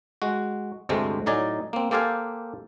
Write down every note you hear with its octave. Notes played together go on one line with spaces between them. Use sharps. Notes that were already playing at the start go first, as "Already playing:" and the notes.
G#3 F#4
D2 G2 C3 G#3 A3 C4
A2 F#3 D#4 D5 D#5 G#5
A#3 C4
A#3 G4 A4 C5 F5 G#5